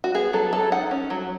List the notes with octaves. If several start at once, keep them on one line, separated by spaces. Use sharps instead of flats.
F#4
B3 G#4
F#3 A4
F#3 A4
D#4 F#5
C#4
F#3